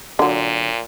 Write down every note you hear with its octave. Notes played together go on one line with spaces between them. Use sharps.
A#2 D3 F#3